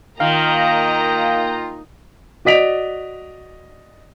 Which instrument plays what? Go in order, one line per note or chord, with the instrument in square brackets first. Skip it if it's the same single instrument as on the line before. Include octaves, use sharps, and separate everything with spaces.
[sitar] D#3 [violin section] A#3 D#5 A#5 [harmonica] F4 G5 [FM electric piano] F5
[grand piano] F#4 D5 D#5 B6 D7 F7